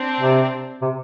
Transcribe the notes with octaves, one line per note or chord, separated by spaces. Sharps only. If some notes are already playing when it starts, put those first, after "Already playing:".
Already playing: C4 D4
C3
C3